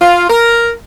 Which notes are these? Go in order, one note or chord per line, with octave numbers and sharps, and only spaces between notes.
F4
A#4